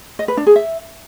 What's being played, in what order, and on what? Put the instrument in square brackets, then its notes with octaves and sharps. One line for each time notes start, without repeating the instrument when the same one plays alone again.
[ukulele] D#5
B4
D4
G#4
E5